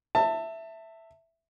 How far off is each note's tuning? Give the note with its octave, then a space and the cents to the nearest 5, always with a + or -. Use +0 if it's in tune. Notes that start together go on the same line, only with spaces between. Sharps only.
E5 +0 A5 +25